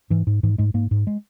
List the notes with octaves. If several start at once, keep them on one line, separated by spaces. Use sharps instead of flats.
G#2 E3
G#2
G#2 E3
G#2 G#3
G#2 A#3
G#2
G#3